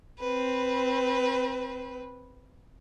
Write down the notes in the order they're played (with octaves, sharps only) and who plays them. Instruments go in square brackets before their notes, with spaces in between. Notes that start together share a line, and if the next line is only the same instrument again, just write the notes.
[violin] C4 B4